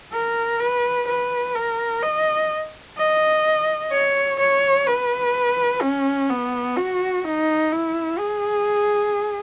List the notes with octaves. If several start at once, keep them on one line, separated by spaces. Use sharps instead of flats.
A#4
B4
B4
A#4
D#5
D#5
C#5
C#5
B4
C#4
B3
F#4
D#4
E4
G#4